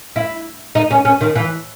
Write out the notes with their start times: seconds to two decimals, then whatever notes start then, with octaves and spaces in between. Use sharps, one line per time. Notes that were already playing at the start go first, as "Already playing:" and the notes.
0.16 E4
0.75 D#4
0.91 C#4
1.05 C#4
1.21 D#3
1.35 E3